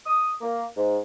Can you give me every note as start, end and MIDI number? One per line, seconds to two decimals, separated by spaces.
0.06 0.32 87
0.41 0.65 58
0.77 0.98 44